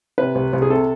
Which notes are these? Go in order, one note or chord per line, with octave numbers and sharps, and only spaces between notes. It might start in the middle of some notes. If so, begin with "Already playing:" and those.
C3 B4
C2
C2
G#4
C3 A4